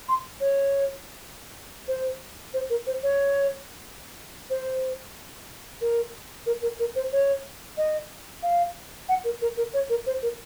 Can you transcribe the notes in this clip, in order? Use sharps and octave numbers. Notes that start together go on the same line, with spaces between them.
C6
C#5
C5
C5
A#4
C5
C#5
C5
A#4
A#4
A#4
A#4
C5
C#5
D#5
F5
F#5
A#4
A#4
A#4
C#5
A#4
C5
A#4